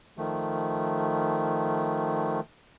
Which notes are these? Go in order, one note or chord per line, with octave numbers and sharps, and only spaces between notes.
D#3 F3 A3